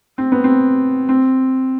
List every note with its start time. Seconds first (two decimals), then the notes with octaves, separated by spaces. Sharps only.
0.18 C4
0.32 B3
0.44 C4
1.09 C4